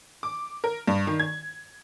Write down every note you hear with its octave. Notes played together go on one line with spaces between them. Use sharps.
D6
A#4
G2
D#3
G#6